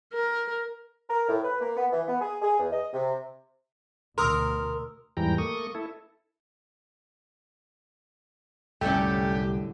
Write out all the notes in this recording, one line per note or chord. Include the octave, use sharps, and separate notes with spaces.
A#4
A#4
A2
B4
A#3
B3
E3
B3
G#4
G#4
E2
D#5
C3
D2 B2 A#4 C6 D#6 E6
E2 G#2 E3 G3 G5 A#5
A3 A#3 C#6 D#6
E4 A4
C2 F#2 A2 D3 A3 C#4 G4